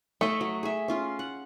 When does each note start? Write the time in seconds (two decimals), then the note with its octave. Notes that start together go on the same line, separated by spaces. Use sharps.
0.21 A3 C#5 D#5 E5
0.41 F#3
0.63 G#4 E5
0.88 C#4 F4 C6
1.19 F#5